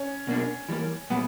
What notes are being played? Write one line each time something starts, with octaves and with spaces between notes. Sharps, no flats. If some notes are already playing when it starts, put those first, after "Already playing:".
Already playing: C#4
B2 A#3 D4
E3 G3 A#3
A#2 G3 B3